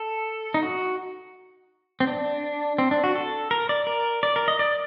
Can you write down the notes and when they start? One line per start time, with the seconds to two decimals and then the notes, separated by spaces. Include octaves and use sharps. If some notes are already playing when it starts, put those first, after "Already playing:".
Already playing: A4
0.54 D#4
0.63 F#4
2.00 C4
2.07 D4
2.79 C4
2.91 D4
3.04 F#4
3.15 A4
3.51 A#4
3.69 D5
3.87 A#4
4.23 D5
4.36 A#4
4.48 D#5
4.59 D5